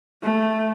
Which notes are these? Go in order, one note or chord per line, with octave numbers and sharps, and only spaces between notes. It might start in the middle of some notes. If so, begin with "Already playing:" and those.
A3